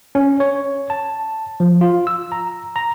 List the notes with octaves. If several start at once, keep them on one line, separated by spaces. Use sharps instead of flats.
C#4
C#5
A5
F3
F4
E6
A#5
A#5